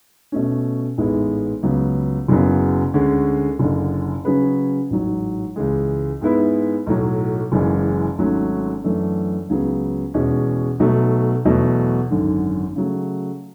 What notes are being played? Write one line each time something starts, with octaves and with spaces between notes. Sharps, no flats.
B2 A3 C#4
A1 G#2 G#3 B3 E4
C#2 C#3 F#3 B3
F#1 F#2 C#3 F#3 B3
D2 D3 G#3 C#4
F#1 F#2 D3
C#3 F#3 C#4 G#4 B4
A1 G#2 F#3
C#2 C#3 E3 G#3
G#2 G#3 B3 E4 B4
B1 A2 F#3
F#1 F#2 E3 G#3
G#1 G#2 F#3 A3 C#4
F#2 E3 A3 D4 A4
C#2 C#3 F#3 B3
E2 B2 G#3 C#4
B1 B2 F#3 A3
E2 B2 F#3 A3
G#1 F#2 D3
C#3 F#3 A3